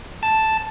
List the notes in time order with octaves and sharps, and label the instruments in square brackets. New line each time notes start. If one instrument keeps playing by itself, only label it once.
[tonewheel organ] A5